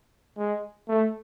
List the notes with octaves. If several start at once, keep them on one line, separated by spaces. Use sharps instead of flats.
G#3
A3